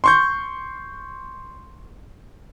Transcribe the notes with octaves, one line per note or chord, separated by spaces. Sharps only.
C6 C#6 G6